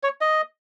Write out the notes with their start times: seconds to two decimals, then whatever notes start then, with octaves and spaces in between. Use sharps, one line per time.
0.03 C#5
0.21 D#5